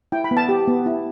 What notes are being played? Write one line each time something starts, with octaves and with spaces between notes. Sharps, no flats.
E4 G5
B5
B3
A5
G4
B3
E4